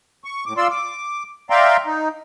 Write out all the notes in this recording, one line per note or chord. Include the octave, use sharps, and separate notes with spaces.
C#6
A2 D6
F4 D5 C6 E6
D6
D5 E5 F5 G5 A#5 C6
D#4